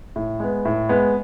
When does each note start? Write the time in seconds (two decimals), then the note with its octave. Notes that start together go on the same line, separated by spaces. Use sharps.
0.16 A2
0.40 G#3 B3
0.65 A2
0.89 G#3 B3